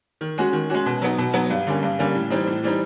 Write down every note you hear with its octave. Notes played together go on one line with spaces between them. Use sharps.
D#3
G#3 C#4 F#4
D#3
G#3 C#4 F#4
B2
F#3 B3 D#4
B2
F#3 B3 D#4
G2
D3 G3 A#3 C#4
G2
D3 G3 A#3 C#4
A2
E3 G3 C4 D#4
A2
E3 G3 C4 D#4